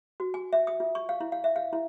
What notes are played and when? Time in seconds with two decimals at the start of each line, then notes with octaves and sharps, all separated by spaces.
0.20 F#4
0.34 G#5
0.53 E5
0.67 D#6
0.80 F4
0.95 C#6
1.09 F5
1.21 E4
1.32 F5
1.44 E5
1.56 F5
1.73 E4